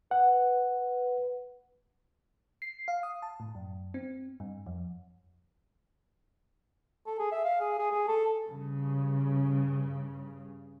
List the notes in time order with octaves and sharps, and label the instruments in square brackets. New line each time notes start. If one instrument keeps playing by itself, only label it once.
[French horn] B4 [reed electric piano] F#5
[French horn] B4
[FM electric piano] C7
F5
D#6
A5
A2
F#2
C4
G2
F2
[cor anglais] A4
G#4
E5
F5
G#4
G#4
G#4
A4
[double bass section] G2 C#3